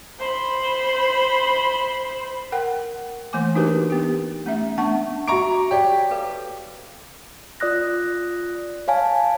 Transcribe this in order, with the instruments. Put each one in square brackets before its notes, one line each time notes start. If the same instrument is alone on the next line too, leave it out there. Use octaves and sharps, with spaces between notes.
[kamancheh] C5 B5
[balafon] A#4 F#5 G5
E3 A3 A#3 G#5 D6
D4 D#4 F#4 G4 A#4 B4
B3 G4
A3 C#4 E5
A3 B3 D4 F#5 A5 C#6
[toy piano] F#4 E5 D6 [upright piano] A#5 C#6 D7
[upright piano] G4 [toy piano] C#5 D5 G5
[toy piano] A4 B4 F5
[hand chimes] F4 D5 D#6 F#6 A#6
C#5 F5 G#5 A5